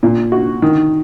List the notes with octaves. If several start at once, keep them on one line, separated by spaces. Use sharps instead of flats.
A#2
F#4
D#3